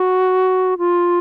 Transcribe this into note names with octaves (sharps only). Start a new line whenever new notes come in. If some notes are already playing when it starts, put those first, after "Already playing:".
Already playing: F#4
F4